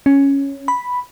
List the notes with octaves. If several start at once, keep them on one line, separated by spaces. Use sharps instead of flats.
C#4
B5